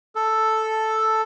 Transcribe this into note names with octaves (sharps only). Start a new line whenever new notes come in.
A4